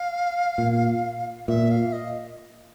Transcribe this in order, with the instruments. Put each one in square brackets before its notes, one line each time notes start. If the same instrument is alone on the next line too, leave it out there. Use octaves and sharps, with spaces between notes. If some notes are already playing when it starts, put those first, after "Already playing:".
Already playing: [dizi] F5
[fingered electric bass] A#2
[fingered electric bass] A#2 [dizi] E5
[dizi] F5
D#5